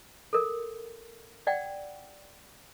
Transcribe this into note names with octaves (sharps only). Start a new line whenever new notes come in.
A4 A#4
D5 F#5 G5